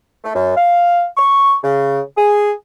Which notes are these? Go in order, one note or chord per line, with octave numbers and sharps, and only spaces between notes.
A3
F#2
F5
C#6
C#3
G#4